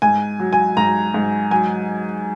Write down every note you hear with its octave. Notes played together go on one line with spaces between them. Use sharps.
G#2 G#5
F#3
G#5
G#2 A#5
G#2
F#3 G#5